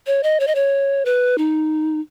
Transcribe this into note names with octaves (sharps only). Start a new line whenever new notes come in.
C#5
D#5
C#5
D#5
C#5
B4
D#4